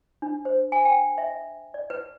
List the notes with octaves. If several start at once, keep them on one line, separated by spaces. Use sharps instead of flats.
D4
C5
G#5
G5
E5
E5
D5
B4